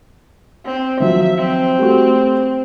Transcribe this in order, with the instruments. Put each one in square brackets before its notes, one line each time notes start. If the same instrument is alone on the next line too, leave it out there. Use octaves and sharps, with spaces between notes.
[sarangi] C4
[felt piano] D#3 F3 F#3 [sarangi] E5
[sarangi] C4
[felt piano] G3 A3 F#4